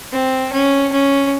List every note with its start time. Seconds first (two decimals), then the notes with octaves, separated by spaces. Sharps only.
0.12 C4
0.53 C#4
0.93 C#4